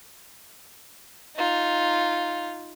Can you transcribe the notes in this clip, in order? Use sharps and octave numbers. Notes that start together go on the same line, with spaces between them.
D#4 F4